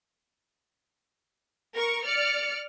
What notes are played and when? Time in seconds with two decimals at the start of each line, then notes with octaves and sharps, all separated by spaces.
1.75 A#4 C#6
2.05 D5 F6 C#7